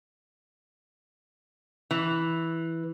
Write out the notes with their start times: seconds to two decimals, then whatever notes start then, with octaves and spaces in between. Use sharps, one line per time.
1.91 E3